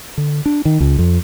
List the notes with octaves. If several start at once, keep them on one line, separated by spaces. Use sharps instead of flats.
D3
D4
D#3
C#2
F2